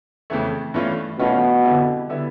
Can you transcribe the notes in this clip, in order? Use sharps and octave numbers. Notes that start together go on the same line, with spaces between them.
F2 C#3 E3 A3
G2 E3 A3 C#4 F4
G2 B2 E3 A3 C#4 F4
F2 D3 G3 B3 E4
D3 G3 B3 E4